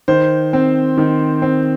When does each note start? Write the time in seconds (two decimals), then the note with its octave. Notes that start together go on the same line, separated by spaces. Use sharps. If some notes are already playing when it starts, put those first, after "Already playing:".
0.08 D#3 C5
0.53 C4
0.97 D#3
1.42 C4